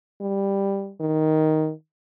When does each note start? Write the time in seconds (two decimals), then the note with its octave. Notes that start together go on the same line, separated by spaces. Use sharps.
0.21 G3
1.01 D#3